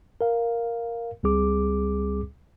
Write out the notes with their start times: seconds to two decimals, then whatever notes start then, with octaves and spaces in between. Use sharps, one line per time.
0.21 A#4 F5
1.23 C#2 G3 C4 G#4 D6